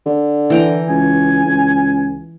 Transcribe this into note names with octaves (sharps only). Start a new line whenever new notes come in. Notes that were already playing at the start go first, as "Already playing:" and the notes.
D3
E3 G5 A#5
C#2 G#5
C#2